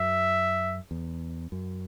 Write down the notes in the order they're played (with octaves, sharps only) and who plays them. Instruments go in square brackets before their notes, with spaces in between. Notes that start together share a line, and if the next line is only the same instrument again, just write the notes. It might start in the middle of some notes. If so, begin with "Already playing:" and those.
Already playing: [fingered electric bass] F#2 [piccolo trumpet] E5
[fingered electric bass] E2
F#2